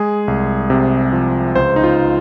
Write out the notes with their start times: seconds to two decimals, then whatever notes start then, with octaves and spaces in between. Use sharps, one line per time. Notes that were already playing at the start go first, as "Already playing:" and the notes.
Already playing: G#3 G#4
0.28 C2
0.70 C3
1.13 F3
1.55 C#2 C5
1.76 D#4
1.84 F4